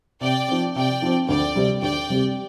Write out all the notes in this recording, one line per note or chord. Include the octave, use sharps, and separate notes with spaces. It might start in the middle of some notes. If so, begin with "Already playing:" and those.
C3 D5 G5
F3 C4
C3 D5 G5
F3 C4
D2 D5 G5
C3 G3 C4 G4
D2 D5 G5
C3 G3 C4 G4